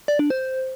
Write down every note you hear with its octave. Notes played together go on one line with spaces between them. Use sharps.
D5
D4
C5